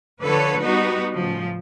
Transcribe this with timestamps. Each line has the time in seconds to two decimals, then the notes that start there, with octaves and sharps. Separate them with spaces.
0.21 D3 F3 A4 B4 C#5
0.61 G3 B3 D#4 F#4 B4
1.14 A2 C#3 F3